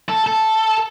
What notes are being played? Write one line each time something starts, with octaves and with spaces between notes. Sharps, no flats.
A4
A4